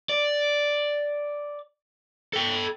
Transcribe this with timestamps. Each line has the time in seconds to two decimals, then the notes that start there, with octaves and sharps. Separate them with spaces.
0.09 D5
2.33 A4 G5